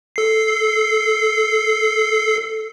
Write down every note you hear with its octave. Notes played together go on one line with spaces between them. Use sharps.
A4 C7